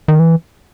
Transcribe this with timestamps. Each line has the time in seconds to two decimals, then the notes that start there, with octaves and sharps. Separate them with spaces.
0.08 D#3
0.19 E3